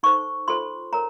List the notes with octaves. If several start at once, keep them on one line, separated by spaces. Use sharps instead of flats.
D#4 A4 C5 C#6
F4 A4 C5 C6
A#4 C#5 A#5